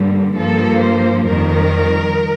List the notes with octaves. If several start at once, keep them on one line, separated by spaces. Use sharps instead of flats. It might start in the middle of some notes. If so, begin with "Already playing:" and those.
Already playing: G2 D3 G3 A#3
G2 F3 A#3 A4
C5
F2 D#3 G3 A#4